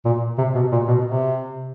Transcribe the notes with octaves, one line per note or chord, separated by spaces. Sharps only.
A#2
C3
B2
A#2
B2
C3